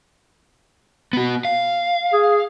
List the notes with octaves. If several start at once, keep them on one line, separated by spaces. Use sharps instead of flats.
B3 F#4
F5
G#4